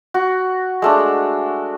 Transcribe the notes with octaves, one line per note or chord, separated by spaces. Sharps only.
F#4
G#3 A3 D4